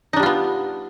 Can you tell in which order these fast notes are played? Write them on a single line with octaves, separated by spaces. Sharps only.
D#4 D4 G3 F4 B3